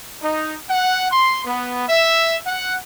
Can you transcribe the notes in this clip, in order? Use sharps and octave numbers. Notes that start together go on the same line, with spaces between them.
D#4
F#5
C6
B3
E5
F#5